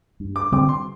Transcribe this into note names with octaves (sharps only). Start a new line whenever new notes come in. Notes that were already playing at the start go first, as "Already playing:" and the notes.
G2
D6
D3 G3 C4 D6
C6